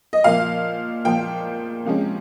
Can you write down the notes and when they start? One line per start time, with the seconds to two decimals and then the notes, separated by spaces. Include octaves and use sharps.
0.13 D#5
0.24 A#2 F3 A#3 F5
1.05 A#2 F3 A#3 G5
1.85 C3 F3 G#3 C#4